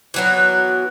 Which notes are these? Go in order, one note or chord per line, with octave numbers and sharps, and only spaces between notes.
E3 F#3 B3